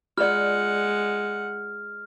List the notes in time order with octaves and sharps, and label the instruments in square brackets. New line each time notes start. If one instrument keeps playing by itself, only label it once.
[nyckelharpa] G#3 F#5 [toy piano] F4 D5 [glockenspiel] F6